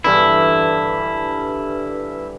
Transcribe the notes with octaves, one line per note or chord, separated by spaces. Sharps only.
G2 D3 E3 E4